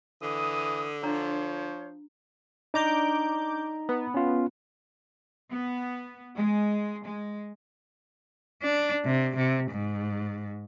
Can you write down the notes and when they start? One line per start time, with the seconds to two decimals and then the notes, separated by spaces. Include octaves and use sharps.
0.22 D3 E3 D#6
1.03 F3 D4 F4 C5 C#5 A#5
2.74 D4 D#4 A#5 D6 G6
3.89 B3
4.14 C#4 F4
5.50 B3
6.36 G#3
7.04 G#3
8.62 D4
9.05 C3
9.36 C3
9.71 G#2